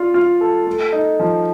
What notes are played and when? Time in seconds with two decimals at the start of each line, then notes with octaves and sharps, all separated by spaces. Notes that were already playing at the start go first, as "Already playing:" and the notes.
Already playing: F4 D5
0.14 F4
0.41 A4
0.67 A3
0.92 D#4
1.20 F3